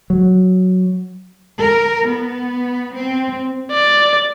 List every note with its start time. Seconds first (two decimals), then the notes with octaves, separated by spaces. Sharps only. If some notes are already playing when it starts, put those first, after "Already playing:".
0.10 F#3
1.59 A#4
2.07 B3
2.93 C4
3.71 D5